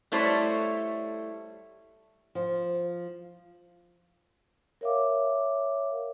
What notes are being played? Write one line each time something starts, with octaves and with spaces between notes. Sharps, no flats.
G3 A3 E4 A4 C5 C#5
F3
A#4 C#5 E5 F5 D6